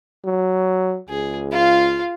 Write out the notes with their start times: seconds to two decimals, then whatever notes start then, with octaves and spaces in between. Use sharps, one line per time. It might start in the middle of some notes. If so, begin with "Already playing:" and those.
0.24 F#3
1.09 C#2 G#4
1.52 F4 F5